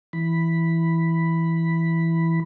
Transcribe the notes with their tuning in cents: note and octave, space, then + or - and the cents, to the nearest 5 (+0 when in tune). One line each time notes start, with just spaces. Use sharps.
E3 +0 B5 +0